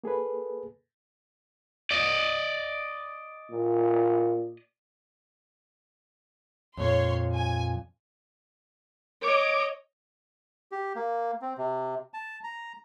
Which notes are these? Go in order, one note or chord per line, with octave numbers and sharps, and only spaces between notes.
A#3 G#4 A4 B4
D5 D#5
A#2
F2 A#2 C#5 C6
G#5
C#5 D#5 D6
G4
A#3
C4
C3
A5
A#5